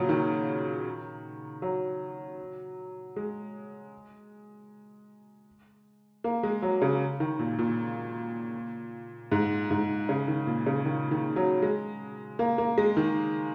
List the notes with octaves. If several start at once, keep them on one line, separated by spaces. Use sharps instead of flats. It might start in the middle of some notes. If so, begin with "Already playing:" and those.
Already playing: A#2 C#3 F#3
D#3
F#3
G#3
A#3
G#3
F#3
C#3
D#3
A#2
A#2
G#2
G#2
C#3
D#3
A#2
C#3
D#3
D#3
F#3
G#3
A#3
A#3
G#3
D#3